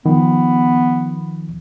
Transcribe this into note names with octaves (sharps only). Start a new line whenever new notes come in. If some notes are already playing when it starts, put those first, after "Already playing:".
D#3 F3 B3